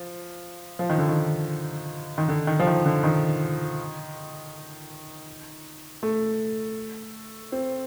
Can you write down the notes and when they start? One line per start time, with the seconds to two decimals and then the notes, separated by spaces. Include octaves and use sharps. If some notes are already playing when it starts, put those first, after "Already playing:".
Already playing: F3
0.79 F3
0.90 D#3
0.98 D3
1.08 D#3
2.18 D#3
2.28 D3
2.47 D#3
2.59 F3
2.67 D#3
2.86 D3
3.03 D#3
6.03 A3
7.52 C4